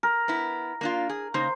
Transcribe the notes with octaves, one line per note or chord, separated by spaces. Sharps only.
A#4
B3 E4
A#3 D4 F4
G#4
C#3 A#3 D#4 C5